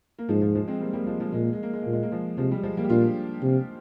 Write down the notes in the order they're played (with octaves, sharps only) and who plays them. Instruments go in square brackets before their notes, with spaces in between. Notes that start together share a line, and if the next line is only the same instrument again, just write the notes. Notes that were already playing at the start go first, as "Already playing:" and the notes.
[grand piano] A#3
[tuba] G#2 [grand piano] F3 G#3
[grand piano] F3
F3 G#3
G#3 C4
G3 A#3
G3 A#3
F3 G#3
F3 G#3
[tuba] A#2 [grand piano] G#3
[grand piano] A#3
G#3
A#3
G#3
[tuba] A#2 [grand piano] A#3
[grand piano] G#3
A#3
F3 G#3
[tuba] C3 [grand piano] F3 G#3
[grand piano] G3
F3 G#3
G3 A#3
G4
[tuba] A#2 [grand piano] D4 F4
[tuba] C3